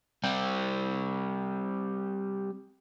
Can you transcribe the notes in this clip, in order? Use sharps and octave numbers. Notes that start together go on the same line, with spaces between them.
G3 C4